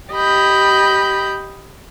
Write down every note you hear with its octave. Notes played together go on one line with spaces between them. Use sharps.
G4 D#5 B5 G6